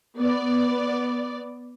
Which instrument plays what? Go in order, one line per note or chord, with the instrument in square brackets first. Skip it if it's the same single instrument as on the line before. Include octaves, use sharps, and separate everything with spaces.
[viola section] B3 D5